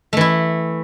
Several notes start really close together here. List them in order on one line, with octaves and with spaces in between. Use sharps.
A3 E3 E4